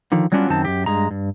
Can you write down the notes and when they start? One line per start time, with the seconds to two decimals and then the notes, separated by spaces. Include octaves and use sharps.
0.12 D3 D#3 F3
0.32 F#3 G3 B3 C#4 D4 F4
0.49 F#2 D#3 C4 A5
0.65 F#2 G4
0.86 G2 G#3 A#5
1.11 G2